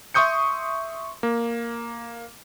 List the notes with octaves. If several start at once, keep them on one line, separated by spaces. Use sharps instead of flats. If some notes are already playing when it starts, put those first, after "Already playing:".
E5 C6 C#6 D#6 G6 C#7
A#3